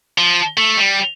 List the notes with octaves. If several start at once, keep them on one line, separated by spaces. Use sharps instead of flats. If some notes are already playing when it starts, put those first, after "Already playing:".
F3
A3
G3